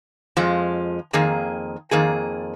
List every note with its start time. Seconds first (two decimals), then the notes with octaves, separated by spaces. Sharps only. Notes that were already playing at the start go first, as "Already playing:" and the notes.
0.37 F2 F3 G#3
1.13 F2 D#3 A#3 G#4
1.91 F2 D#3 A#3 G#4